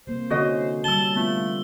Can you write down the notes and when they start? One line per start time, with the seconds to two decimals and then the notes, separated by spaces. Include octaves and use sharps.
0.07 C3 A#3 C5
0.30 D3 C#4 E4 F#4 D#5
0.84 D3 G3 A5 E6 G7
1.15 A3 B3 F4